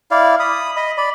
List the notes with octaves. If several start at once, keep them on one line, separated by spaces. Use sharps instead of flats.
E4 D5 F5
B5 D#6
D#5 B5
D5 B5